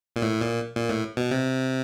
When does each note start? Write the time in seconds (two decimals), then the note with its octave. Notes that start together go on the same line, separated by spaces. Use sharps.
0.16 A#2
0.22 A2
0.41 A#2
0.76 A#2
0.90 A2
1.17 B2
1.31 C3